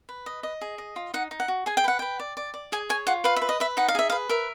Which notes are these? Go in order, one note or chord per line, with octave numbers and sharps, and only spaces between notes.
B4
D#5
D#5
G#4
D#5
F4
D#4 F#5
D#4
F#5
F#4
G#4 G#5
G5
B4 F#5
B4 G5
D5
D5
D5
G#4 G#5
C#5 G#5
F4 F#5
B4 F5
E5
B4
D#5
B4 E5
D#4 F#5
F5
G#4 E5
B4 F5
A#4 E5